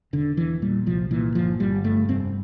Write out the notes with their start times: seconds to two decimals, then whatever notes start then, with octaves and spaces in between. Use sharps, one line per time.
0.13 E1 D3
0.37 E2 E3
0.62 A#2 G3
0.86 C2 F3
1.11 A#2 E3
1.35 G1 F3
1.60 G1 G3
1.84 G2 A3
2.09 F1 C4